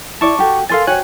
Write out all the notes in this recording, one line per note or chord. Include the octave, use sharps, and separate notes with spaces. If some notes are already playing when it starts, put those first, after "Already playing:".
E4 D5 A5 C#6 D6
F#4 G4 A4
A4 A#4 F5 G#5 C6 A6
F#4 G4 C5 C#5 G#5 F#6